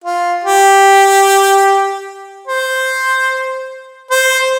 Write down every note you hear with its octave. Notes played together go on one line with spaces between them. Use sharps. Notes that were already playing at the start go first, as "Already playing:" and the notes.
F4
G4
C5
C5